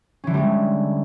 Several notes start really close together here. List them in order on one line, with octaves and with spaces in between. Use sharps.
C#4 E3 D3 G3 G#3